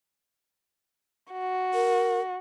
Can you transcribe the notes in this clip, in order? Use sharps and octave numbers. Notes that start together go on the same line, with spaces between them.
F#4
A#4